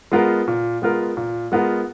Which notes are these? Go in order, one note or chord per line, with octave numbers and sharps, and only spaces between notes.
G#3 B3 F4 A#4
A#2
G#3 B3 F4 A#4
A#2
G#3 B3 F4 A#4